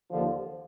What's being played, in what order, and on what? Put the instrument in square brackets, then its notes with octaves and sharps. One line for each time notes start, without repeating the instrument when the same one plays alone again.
[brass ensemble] D#2 D3 F3